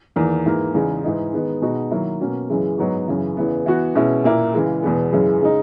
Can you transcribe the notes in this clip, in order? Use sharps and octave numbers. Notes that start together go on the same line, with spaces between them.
E2 D#3 A#3
G#2 E3 A#3
E2 C#3 G#3 D#4
G#2 E3 G#3 D#4
D#3 G#3 B3 D#4
B2 G#3 D#4 F#4
D#3 F#3 A#3 E4
B2 A#3 C#4 F#4
F#2 C#3 E3 G#3
G#2 F#3 B3 D#4 F#4
F#2 C#3 E3
E2 C#3 E3 B3
E3 B3 F#4
B2 G#3 C#4 E4
A#2 A#3 E4
C#3 E3 G#3
E2 B2 G#3 B3
F#2 C#3 E3 G#3
C#3 G#3 D#4